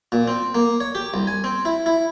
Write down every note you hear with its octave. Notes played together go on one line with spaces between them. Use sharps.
A#2
C4
A#3
C#5
G4
C2
G#5
C4
E4
E4